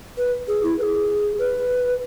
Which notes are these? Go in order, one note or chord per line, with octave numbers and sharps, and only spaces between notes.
B4
G#4
E4
B4
G#4
B4